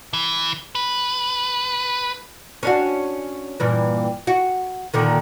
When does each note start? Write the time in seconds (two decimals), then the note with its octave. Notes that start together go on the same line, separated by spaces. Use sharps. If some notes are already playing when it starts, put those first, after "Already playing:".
0.13 E3
0.75 B4
2.63 C#4 D4 F#4
3.60 G2 A#2 E3
4.27 F#4
4.94 A#2 D3 D#3